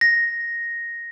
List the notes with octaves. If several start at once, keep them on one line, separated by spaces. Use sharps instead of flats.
A#6